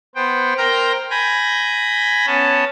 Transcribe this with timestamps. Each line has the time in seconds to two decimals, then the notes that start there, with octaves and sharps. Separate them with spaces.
0.15 B3 C5 G5
0.58 A#4 C5 G5 A#5 F6 G6
1.11 G#5 B5 G6 A#6
2.26 B3 C#4 A5